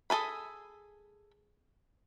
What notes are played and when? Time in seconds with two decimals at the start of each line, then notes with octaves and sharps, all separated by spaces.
0.10 G#4 A4 G#5 B5